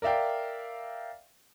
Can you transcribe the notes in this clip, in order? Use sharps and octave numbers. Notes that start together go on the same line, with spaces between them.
A#4 D5 E5 F5 G5